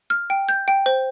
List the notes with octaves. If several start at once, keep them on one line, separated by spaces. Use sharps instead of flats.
F6
G5
G6
G5
C5